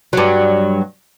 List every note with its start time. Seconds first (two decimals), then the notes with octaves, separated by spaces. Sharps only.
0.13 G2 F#3